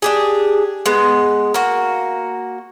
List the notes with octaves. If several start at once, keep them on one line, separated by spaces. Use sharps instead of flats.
D4 G4 G#4
G#3 B3
A#3 F#4